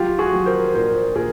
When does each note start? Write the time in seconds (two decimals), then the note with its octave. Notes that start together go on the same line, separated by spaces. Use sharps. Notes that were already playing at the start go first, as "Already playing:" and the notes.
Already playing: F#3 F4 G4
0.18 F#4 G#4
0.33 F#3
0.46 A#4 C5
0.75 A#2 A#4 C5
1.15 A#2 G#4 A#4